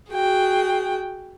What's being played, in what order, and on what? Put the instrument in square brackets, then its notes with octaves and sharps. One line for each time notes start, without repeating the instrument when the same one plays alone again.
[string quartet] F#4 G#4 G5